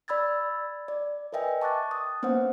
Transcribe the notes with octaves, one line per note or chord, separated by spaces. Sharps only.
D5 B5 E6 G#6 A6
D5
A#4 B4 D#5 E5 G5 G#5
A5 C#6 D6 F#6 A6
D#6
A#3 B3 C#4 C5 F#5